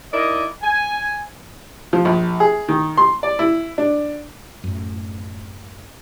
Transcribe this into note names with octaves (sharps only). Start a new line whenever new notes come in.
D#4 E4 A#4 D5 D#5
G#5
F3
A#1
G#4
D#3
C6
D5
E4
D4
F#2 A2